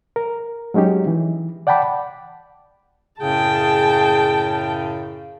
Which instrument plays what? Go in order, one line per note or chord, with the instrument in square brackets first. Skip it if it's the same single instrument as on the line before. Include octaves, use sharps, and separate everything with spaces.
[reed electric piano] A#4
F#3 G#3 C#4 D#4 G4
E3
D5 F#5 G5 A5 B5 D6
[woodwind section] F#2 A2 C#3 [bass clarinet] G#4 [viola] G5 A5